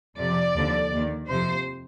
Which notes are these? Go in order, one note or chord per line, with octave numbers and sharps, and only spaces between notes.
F2 C3 F3 D5
D#2 D3 F3
D#2 D#3
F2 C3 F3 C5